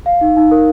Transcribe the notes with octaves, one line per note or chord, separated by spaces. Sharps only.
F5
D#4
D#4
A#4